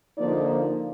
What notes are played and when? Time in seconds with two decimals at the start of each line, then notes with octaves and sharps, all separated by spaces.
0.17 D3 F3 A#3 D#4 D5